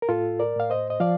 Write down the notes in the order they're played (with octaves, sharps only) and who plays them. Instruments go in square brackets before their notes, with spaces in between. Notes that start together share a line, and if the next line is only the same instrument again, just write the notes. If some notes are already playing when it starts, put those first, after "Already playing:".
[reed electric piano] A#4
A2 F4 A4
A#4 D5
A2 F5
C5 D#5
D#5
F3 D5 F5